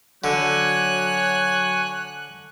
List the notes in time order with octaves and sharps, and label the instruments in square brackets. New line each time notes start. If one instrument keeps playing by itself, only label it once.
[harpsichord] D3 [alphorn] F#3 [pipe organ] C#5 G#5 [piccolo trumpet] F#6